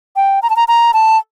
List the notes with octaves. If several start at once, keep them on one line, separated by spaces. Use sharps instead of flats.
G5
A#5
A5
A#5
A#5
A5